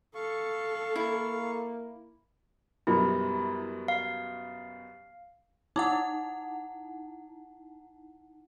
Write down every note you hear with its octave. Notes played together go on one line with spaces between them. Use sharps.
A4 F5 C#6
A#3 E4
F#2 B2 G3 E4
F5
D#4 E4 F#5